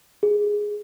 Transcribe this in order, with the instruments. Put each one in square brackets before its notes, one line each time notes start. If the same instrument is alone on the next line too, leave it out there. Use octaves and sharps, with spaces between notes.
[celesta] G#4